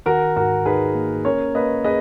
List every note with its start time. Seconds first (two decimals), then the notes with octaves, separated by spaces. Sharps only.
0.06 D#3 F#4 A#4
0.37 G#2 F#4 A#4
0.65 D#4 G#4 B4
0.95 A#3
1.25 C#4 A#4 C#5
1.55 A#3 B4 D#5
1.84 G#4 B4 D#5